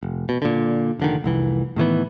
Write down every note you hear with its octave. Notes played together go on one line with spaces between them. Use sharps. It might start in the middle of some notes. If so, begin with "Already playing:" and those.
F1
B2
A#2 D3
F1 D3 D#3
F1 C2 E3
A2 D#3 E3 B3